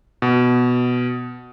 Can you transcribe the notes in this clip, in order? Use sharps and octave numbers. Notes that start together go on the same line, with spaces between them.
B2